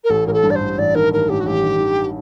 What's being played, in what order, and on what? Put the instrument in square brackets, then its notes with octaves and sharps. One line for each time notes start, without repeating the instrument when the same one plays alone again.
[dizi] A#4
[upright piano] A1 [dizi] A4
[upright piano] A1 [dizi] A#4
[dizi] A4
[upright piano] G2
[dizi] D5
C5
[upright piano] A1
[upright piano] A1 [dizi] D5
[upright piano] D#3 [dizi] A#4
[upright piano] A1 [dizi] A#4
[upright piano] A1 [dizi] G4
[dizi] F#4
[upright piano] A1 [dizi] G4
[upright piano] D#3
D#3